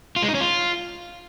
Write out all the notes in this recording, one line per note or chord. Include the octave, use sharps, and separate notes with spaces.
F4
G#3
D#4
C#4
F4